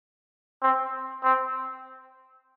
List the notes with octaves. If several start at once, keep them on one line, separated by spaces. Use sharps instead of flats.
C4
C4